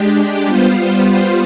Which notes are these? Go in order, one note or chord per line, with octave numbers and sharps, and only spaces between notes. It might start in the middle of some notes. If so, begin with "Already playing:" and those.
Already playing: G#3 D4 G4
G3 B3 F4 C5